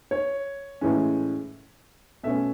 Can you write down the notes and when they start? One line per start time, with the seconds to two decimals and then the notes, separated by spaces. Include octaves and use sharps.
0.11 C#5
0.81 A2 E3 G#3 C#4
2.23 B2 A3 C#4 E5